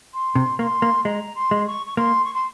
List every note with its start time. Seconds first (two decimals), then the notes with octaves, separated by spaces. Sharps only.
0.13 C6
0.35 C3
0.59 A#3 C#6
0.63 C6
0.82 A#3
1.05 G#3 A#5
1.35 C6
1.51 G#3
1.67 C#6
1.86 C#6
1.97 A#3 C6
2.24 C#6
2.34 C6